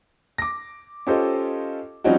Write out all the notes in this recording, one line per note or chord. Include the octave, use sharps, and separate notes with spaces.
D6 A#6
C#4 F4 G4 A4 C5 D#5
F3 G3 C4 C#4 D#4 F#4